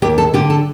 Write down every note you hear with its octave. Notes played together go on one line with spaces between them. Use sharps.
D#2 G4
A4
D3 G4
A4